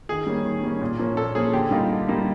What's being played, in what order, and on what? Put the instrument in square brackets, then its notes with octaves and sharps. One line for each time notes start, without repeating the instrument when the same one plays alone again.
[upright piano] D#3 [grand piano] G#4
[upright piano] G3 A#3 C#4
D#3
G3 A#3 C#4
A#2
F3 A#3 C#4
[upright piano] A#2 [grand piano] A4
[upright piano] F3 A#3 C#4 [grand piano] G#4
[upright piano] D3 [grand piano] G4
[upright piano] G3 A#3 D#4 [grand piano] F4
[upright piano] D3
G3 A#3 D#4